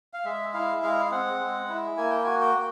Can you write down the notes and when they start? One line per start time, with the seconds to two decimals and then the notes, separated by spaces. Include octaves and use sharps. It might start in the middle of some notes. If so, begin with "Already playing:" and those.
0.13 F5
0.25 G#3 E5
0.54 E4 F5
0.83 G#3 F5
1.05 F5
1.11 C4 F#5
1.40 G#3
1.69 E4
1.97 A#3 G#5
2.10 G5
2.24 F#4 G#5
2.41 G5
2.55 A#3